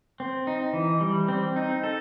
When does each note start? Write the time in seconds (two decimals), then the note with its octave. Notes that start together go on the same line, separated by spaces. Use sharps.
0.20 C4
0.47 D#4
0.73 E3
1.01 G3
1.29 C4
1.56 D#4
1.83 A4